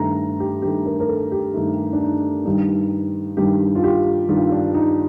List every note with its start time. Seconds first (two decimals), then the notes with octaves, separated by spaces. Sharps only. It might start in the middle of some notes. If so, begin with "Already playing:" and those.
Already playing: G2 D#3 A3 A#5
0.40 G4
0.62 G2 D#3 A3 G4
0.86 A#4
1.00 A#4
1.09 A4
1.31 G4
1.54 G2 D#3 A3 D#4
1.93 D4
2.00 D#4
2.45 G2 D#3 G3 D#4
3.37 G2 D#3 G3 G4
3.75 F4
3.84 G4
4.29 G2 D#3 G3 F4
4.52 D4
4.74 D#4